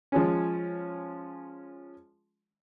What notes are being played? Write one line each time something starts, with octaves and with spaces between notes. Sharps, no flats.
F3 G#3 C#4